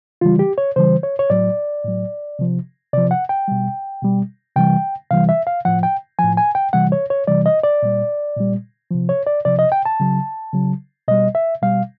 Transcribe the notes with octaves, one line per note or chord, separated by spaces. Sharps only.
C#3 E3 G3 F4
G4
C#5
C#3 E3 G3 C5
C#5
C#5
A2 F#3 D5
A2 F#3
C3 F3
C3 F3 D5
F#5
G5
B2 G3
B2 G3
C3 E3 G3 G5
C3 E3 G3 F5
E5
F5
A2 F3 F#5
G5
A2 F3 G#5
G#5
G5
C3 E3 G3 F#5
C#5
C#5
C3 E3 G3 D5
D#5
D5
A#2 G3
A#2 G3
C3 F3
C#5
D5
C3 F3 D5
D#5
G5
A5
C#3 F#3
C#3 F#3
B2 G3 D#5
E5
B2 G3 F5